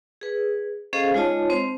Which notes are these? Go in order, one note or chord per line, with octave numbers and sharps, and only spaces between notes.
G#4 B4
C#4 G#4 A4 C5 D#5 F5
G#3 D#4 F4 C#5 D#5 A5
C4 C5